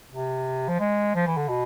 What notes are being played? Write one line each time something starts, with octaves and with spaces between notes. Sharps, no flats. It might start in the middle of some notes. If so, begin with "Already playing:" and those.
C3
F3
G#3
F3
E3
D3
B2